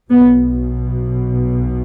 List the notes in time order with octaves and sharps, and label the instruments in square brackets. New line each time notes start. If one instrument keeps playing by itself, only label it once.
[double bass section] B1 B2 B3